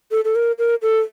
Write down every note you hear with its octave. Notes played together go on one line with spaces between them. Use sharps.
A4
A4
A#4
A#4
A4